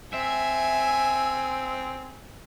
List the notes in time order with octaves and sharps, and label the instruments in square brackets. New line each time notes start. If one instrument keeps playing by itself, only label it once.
[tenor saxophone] C4 [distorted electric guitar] E5 [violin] G#5